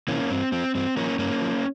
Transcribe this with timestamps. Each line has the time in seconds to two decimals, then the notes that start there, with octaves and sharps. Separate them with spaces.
0.08 C3 E3 A#3 C#4
0.30 G2 C4
0.52 F3 C4
0.75 G2 C4
0.97 F3 A#3 C#4
1.19 G2 A#3 C#4
1.42 F3